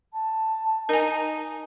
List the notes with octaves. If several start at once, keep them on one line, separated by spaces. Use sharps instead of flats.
A5
D#4 A#4 G#5